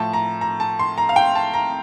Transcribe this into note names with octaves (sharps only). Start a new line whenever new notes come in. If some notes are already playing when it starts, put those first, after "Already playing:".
Already playing: A2 F3 A5
A#5
A#5
A5
C6
A#5
F5
G5
A5
A#5